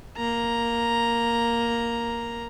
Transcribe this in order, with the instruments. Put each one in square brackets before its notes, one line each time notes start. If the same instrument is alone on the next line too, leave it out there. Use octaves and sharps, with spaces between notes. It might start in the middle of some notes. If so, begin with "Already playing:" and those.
[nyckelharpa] A#3 A#5